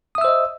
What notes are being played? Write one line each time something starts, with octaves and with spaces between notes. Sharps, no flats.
C5 D#5 E5 D#6 E6